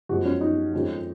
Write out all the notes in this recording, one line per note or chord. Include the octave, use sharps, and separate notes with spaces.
F#2 F3 G#3 F#4
C#4
D#4
F2 D#3 G#3 C#4